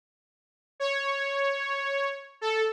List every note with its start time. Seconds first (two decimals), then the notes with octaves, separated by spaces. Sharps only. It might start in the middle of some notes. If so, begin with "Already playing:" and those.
0.80 C#5
2.41 A4